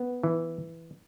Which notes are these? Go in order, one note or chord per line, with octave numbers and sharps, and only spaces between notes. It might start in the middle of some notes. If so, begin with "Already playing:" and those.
Already playing: B3
E3